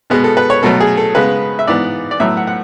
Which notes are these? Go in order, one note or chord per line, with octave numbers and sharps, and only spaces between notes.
B2 G#3 B3
A4
B4
C#5
B2 F#3 A3 A4
G#4
A4
C#3 G#3 B3 B4
E5
G#2 E3 B3 D5
D5
A2 F#3 B3 E5
F#5
F#5